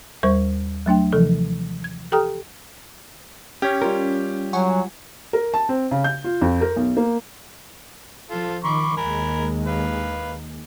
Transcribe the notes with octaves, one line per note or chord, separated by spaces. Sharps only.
D#2 G3 A#4 C5 C#6
F#3 A3 D4 G5
C3 E3 F3 A4
G#6
G4 A4 G5 A#5 D#6 F6
C#4 G4 C#5
G3 F4 A#4
F#3 F#5 G#5 C#6
A#4
A5
C4
C#3
G6
F4
F2
A#4
B1
A#3
F3 F4 A4
D#3 B5 C#6 D6
D#2 G#3 A#3 A#4 G#5 B5
B4 F5